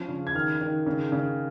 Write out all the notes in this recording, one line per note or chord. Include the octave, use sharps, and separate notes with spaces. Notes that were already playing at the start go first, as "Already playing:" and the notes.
Already playing: F3 C#4
C#3
G#6
D#3 F6
D#3
C#3
C#3